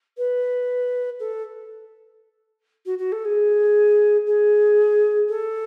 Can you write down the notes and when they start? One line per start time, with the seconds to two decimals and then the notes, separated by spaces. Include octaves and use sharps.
0.17 B4
1.19 A4
2.85 F#4
2.98 F#4
3.12 A4
3.25 G#4
4.26 G#4
5.29 A4